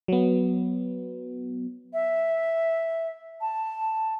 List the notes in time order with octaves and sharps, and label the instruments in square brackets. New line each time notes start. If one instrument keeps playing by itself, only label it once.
[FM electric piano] F#3 B3
[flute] E5
A5